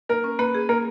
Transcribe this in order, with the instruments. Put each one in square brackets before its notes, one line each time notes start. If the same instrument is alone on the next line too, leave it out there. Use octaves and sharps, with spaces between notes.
[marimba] A#3 [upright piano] A#4
[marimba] C#4
[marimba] A#3 [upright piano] B4
[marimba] G#4
[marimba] A#3 [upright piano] A#4